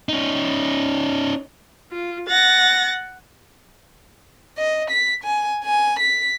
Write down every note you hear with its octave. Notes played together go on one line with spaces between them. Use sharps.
C#4 D#4
F4
F#5 A6 A#6
D#5
B6
G#5
G#5
B6